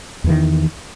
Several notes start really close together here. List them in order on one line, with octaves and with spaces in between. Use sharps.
E2 E3 D#3